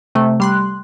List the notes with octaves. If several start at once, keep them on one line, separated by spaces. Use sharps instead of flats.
C3 A3
G3 C6 F#6